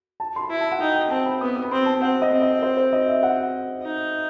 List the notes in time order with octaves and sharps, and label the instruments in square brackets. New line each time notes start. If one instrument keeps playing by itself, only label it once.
[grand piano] A5
C6
B5
[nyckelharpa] E4
[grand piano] A5
F#5
[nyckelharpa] D#4 [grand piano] G5
[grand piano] G5
[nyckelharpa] C4 [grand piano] A5
[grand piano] B5
[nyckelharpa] B3 [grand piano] D#6
[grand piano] D#6
B5
[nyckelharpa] C4 [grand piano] C6
[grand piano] A5
[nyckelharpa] C4 [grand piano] F#5
[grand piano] D#5
[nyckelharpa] C4
[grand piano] D#5
C5
C5
D#5
E5
F#5
[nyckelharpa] D#4